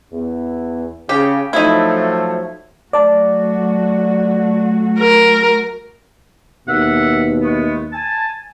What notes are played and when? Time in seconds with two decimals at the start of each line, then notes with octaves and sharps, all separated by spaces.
0.12 E2
1.09 C#3 G4
1.53 F3 F#3 A3 D#4 E4
2.93 F#3 A3 F#4 D5 A5
5.00 A#4
6.68 D#2 B2 A4 E5 F#5
7.41 G#3 A3 B3
7.92 G#5 A5